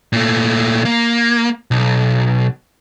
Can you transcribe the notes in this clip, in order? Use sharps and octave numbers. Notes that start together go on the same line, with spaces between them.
A#2 A3
A#3
B1